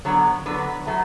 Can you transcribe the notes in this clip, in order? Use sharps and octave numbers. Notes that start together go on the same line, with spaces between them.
D3 F#3 B3 C#5
D3 F#3 B3 B4
F#3 A3